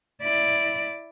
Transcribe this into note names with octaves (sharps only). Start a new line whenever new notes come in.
E4 D5